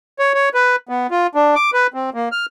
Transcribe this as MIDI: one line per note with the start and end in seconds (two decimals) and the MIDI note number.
0.19 0.34 73
0.34 0.49 73
0.54 0.76 71
0.89 1.07 59
1.11 1.27 65
1.35 1.55 62
1.56 1.70 86
1.73 1.87 71
1.94 2.10 60
2.14 2.29 58
2.32 2.46 89